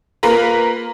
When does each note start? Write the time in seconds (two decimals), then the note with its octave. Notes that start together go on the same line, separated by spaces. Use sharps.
0.23 A#3 F4 A#4 B4 A#5